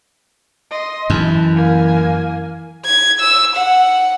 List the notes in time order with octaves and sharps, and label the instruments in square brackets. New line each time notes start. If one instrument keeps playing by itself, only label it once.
[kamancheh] D#5 C6
[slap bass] F#2 [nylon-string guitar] E3 [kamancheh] A5
[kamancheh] A#3 G#5
[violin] G#6
E6
F#5